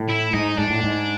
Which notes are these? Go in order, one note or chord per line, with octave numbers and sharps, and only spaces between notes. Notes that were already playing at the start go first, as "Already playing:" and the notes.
Already playing: A2
E4
G#2 D#4
G#2 D4
A2
G#2